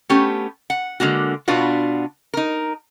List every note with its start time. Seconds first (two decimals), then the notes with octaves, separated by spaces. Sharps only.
0.09 A3 B3 C#4 G4
0.70 F#5
1.00 D3 G#3 A#3 F#4
1.48 B2 B3 D4 F4 F#4
2.33 D#4 A#4